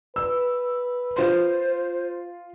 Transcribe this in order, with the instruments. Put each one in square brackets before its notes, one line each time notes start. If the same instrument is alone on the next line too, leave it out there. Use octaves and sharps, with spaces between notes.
[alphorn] B4 [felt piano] E6
[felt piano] F4 C6 [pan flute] C5